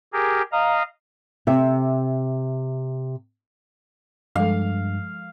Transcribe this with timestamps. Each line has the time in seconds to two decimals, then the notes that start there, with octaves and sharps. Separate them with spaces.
0.13 G4 G#4 A#4
0.52 D#5 F5 A#5
1.47 C3 E5
4.36 G2 F3 G#3 A4 F5